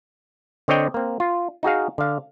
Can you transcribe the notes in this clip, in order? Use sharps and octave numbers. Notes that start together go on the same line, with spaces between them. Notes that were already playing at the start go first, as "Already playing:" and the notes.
D3 C4 C#5 D#5 G5
A#3 C4
F4
D#4 F#4 G#4 F5
D3 F5